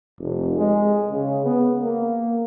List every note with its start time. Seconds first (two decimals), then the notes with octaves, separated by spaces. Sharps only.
0.19 F1
0.56 G#3
1.11 C#3
1.45 B3
1.82 A#3